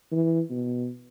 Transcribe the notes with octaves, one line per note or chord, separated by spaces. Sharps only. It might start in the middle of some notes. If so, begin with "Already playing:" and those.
E3
B2